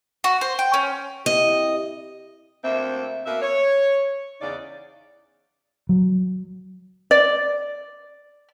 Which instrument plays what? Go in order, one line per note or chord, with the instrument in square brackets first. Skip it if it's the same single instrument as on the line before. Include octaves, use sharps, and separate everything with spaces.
[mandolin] F#4
C5
G5
C#4
[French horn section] C3 E4 G4 [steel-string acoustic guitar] D#5
[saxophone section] D2 A#3 C4 E5
B2 A#3 E5
C#5
E2 C#3 D#4 D5
[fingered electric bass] F#3
[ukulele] D5